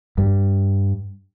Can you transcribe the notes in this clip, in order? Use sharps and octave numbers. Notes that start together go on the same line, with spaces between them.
G2